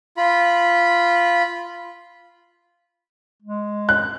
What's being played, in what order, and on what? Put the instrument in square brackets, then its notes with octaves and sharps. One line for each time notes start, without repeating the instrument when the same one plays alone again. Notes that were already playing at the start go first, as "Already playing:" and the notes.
[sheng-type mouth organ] F4 B5
[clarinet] G#3
[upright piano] F#6